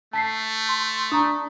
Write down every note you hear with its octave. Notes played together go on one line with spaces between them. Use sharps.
A3 A5 B6 C7
C6
D4 A#5 C#6 D#6